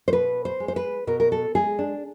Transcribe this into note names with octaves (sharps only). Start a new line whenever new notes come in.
C5
B2 B4
C5
G#3
C5
B4
B2 A#4
A#4
A4
G#3 G#4
D4